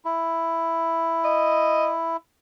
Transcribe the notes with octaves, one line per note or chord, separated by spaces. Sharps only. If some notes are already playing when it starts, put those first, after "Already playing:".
E4
D#5